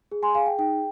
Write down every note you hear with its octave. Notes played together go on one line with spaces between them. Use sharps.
G#4
G#5 C6
G#4 F5 G#5
G5
D#4 G5